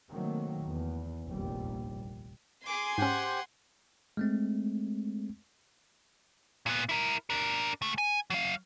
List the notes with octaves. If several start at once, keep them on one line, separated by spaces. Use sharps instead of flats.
C3 D#3 F#3 A3 A#3
E2
F1 A#1 D#2 G3
G#4 G#5 C6 D6 G#6
G#2 C#4 G4 C5 F#5 G5
G#3 A3 C4
A#2 B3
E4 A#4
D4 A#4
C#2 A3
G#5
F#3 F5